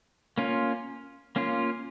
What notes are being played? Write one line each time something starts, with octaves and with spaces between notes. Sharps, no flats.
A#3 C#4 F4
A#3 C#4 F4